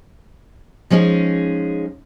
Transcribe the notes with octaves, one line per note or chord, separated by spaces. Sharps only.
F3 G#3 C#4 D#4 G#4